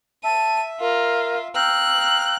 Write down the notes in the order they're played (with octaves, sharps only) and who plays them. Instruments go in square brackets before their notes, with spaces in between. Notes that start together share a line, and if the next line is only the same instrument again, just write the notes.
[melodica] E5 [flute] A5 [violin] D#7
[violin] F4 [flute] A#4
[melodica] F5 G5 A#5 [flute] E6 [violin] F#6